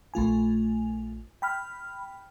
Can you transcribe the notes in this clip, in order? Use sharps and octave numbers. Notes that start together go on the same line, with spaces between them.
A#1 A3 F4 G#5
G5 B5 F6